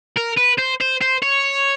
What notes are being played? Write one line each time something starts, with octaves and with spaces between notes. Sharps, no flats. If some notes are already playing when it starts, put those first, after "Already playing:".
A#4
B4
C5
C5
C5
C#5